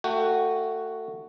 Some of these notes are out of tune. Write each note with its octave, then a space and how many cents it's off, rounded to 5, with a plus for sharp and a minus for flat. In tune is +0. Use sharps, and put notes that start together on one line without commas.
A3 +25 F#4 +0 G5 +0